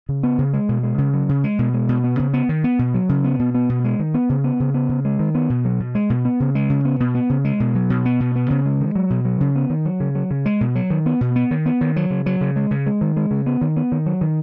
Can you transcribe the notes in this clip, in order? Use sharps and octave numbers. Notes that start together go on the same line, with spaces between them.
C#3
B3
C#3
G#3
B2
G#3
C#3
F#3
C#3
G#3
B2
G#3
B2
B3
C#3
B3
D#3
B3
B2
F#3
C#3
B3
B2
B3
B2
G#3
D#3
B3
C#3
B3
C#3
B3
C#3
G#3
D#3
B3
B2
F#3
B2
G#3
B2
B3
C#3
G#3
C#3
B3
B2
B3
C#3
G#3
B2
F#3
B2
B3
B2
B3
C#3
G#3
D#3
F#3
B2
F#3
C#3
B3
D#3
F#3
C#3
F#3
C#3
G#3
B2
F#3
D#3
B3
B2
B3
D#3
B3
D#3
F#3
C#3
F#3
C#3
G#3
C#3
G#3
D#3
G#3
C#3
B3
D#3
B3
D#3
F#3
D#3